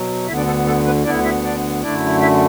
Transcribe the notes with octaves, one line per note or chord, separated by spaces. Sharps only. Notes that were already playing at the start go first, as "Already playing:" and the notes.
Already playing: B2 F#3
D2 D3 B3 E4 E5
D4 D5
A4
A4
B3 B4
D2 D3 B3 D4 E4 D5
E4 E5
D4 D5
F#2 D3 A3 D4 E4 D5
E4 E5